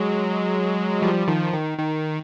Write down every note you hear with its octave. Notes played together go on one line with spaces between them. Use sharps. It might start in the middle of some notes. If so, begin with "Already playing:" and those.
Already playing: F#3 G#3
F3 G3
D#3 F3
D#3
D#3